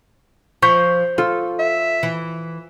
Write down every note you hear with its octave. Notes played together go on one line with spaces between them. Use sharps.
F3 C#6 G6 B6
F4 A4
E5
E3